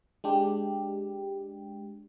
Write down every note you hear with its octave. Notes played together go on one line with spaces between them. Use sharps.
G#3 D4 G4